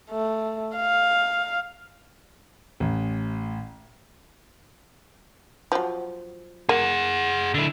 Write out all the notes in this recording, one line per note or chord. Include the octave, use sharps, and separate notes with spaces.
A3
F5
A1
F3 F#3
A#3 G#4 F#5
D3 E4